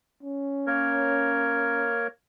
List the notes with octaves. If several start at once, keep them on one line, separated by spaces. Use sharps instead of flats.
C#4
A#3 A#4 C#5